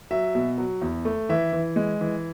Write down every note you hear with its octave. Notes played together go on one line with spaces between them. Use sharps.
F#3 E5
B2
F#3
E2
A3
E3 E5
E3
G#3
E3